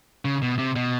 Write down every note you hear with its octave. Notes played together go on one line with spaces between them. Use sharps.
C#3
B2
C3
B2